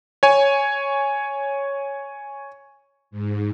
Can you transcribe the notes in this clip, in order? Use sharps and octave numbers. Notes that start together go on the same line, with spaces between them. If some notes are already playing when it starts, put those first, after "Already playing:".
C#5 G#5
G#2